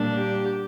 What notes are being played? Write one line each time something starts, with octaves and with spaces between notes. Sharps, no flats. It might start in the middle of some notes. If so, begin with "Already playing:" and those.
Already playing: A#2 G3 A#3 D4
G4